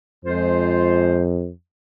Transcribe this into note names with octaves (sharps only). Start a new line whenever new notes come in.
F2 G#3 F4 C5